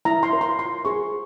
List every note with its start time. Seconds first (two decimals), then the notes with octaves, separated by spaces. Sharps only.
0.05 E4 A#5
0.23 C6
0.33 A#4 C#5
0.41 C6
0.59 F4 C6
0.85 G#4 C5 C#6